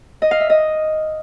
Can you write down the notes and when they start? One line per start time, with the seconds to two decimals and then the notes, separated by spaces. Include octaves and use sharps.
0.22 D#5
0.31 F5
0.40 E5
0.50 D#5